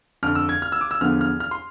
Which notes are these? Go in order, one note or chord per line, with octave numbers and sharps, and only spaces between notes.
F2 D3 F3 F6
E6
G#6
F6
E6
D6
E6
E2 D3 F3 B3 F6
F6
F6
C6